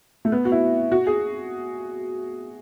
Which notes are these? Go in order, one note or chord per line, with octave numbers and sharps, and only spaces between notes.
A3
B3
F#4
E4
F#4
G#4